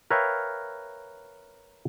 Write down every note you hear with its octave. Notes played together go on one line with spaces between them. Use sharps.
A#4 B4 C#5 E5 F5 G5